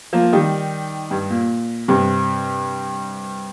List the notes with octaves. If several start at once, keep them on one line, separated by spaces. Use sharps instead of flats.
F3 A#3
D#3 G3
G2
A#2
G2 C3